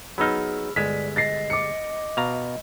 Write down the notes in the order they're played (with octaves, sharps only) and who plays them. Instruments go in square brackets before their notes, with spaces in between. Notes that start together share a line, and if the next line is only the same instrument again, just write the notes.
[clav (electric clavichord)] F#3 B3 D#4 [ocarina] G#4 [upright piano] B5 E6 F6
[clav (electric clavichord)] G1 G#3 [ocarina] D5 [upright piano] B6
[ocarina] D#5 [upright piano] A6 A#6 C7
[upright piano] D6 C#7
[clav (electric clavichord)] B2 F5 A#5